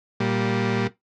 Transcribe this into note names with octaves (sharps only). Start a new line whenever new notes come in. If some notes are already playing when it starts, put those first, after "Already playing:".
A#2 G3